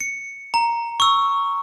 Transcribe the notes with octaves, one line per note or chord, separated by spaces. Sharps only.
C#7
A#5
C#6 E6